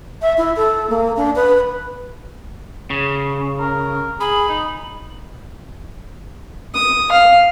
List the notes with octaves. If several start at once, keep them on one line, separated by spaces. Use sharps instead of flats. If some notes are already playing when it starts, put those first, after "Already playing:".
E5
E4
A4
A#3
D4
B4
C#3
A#4
G#4 B5
D#4
D#6
F5